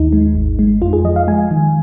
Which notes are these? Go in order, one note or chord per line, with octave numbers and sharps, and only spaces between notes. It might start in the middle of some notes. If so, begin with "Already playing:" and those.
Already playing: D#2 D#4
G#3
G#1
G#3
F2 F4
G#4
F3 D#5
F5
G#3 G#5
D#3